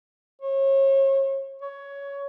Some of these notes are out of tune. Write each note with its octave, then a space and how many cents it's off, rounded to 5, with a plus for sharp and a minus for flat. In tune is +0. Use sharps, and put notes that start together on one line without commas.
C#5 -35
C#5 +15